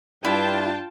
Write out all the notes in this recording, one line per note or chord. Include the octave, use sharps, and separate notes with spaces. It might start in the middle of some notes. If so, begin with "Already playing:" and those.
G2 D4 E4 F4 G5 A5